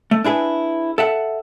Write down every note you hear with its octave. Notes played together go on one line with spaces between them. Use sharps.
A3
D4 E4 G#4 B4
A4 E5 F#5